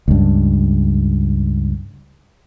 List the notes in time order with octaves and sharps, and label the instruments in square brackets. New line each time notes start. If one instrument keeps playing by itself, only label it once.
[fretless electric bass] C#2 G2